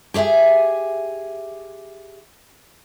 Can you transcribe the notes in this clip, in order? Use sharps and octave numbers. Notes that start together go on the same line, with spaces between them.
G4 G#4 C5 E5 G#5